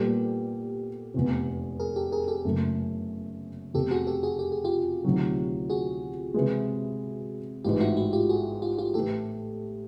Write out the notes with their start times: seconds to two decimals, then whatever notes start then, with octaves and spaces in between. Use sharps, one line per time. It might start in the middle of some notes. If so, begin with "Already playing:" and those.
Already playing: A#2 G3 B3 G4 A4
1.14 F1 E2 C3
1.80 G#4 A#4
1.96 G4 A4
2.12 G#4 A#4
2.28 G4 A4
2.45 F#1 F#2 C#3 F#3 A3
3.74 F1 E2 C3 G4 A4
3.91 F#4 G#4
4.07 G4 A4
4.23 F#4 G#4
4.39 G4
4.52 G#4
4.65 F4 G4
5.04 D2 C3 D#3 F#3
5.70 F#4 G#4
6.34 C3 E3 G#3
7.65 A1 G#2 E3 F4 G4
7.81 E4 F#4
7.97 E4 F#4
8.13 F4 G4
8.29 F#4 G#4
8.62 F4 G4
8.78 F4 G4
8.94 A1 A2 E3 G4 A4